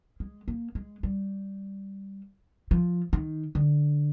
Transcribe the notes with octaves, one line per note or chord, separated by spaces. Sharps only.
G#3
A#3
G#3
G3
F3
D#3
D3